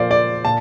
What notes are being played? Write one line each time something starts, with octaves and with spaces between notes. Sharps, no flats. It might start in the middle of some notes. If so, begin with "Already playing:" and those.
Already playing: A#2 F3 A#3 C5 D5
D5
A#2 A5